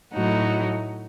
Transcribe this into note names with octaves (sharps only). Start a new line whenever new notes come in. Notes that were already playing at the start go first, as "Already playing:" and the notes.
A2 F#3 A3 D#4 F#4